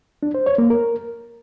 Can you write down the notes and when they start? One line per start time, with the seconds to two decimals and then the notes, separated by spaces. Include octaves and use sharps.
0.23 D4
0.34 C5
0.46 C#5
0.58 A#3
0.70 A#4